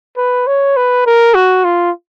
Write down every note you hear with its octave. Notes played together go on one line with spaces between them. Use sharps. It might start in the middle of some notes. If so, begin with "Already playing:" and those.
B4
C#5
B4
A#4
F#4
F4